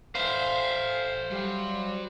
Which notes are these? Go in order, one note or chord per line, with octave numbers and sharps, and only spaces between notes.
A4 B4 C5 E5 F5
F#3 G3 F#4